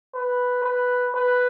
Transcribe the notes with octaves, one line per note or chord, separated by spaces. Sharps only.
B4
B4
B4